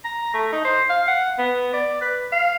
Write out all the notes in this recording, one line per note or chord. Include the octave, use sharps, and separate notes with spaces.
A#5
A3
D#4
C5
F5
F#5
B3
D5
B4
F5